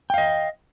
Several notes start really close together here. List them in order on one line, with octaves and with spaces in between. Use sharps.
G5 F5 D#5